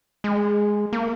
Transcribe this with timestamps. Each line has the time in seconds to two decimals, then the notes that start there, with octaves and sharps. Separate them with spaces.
0.24 G#3
0.93 A#3